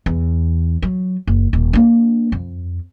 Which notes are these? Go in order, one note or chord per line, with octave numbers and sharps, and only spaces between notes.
E2
F#3
F#1
D#1
A#3 D4
F2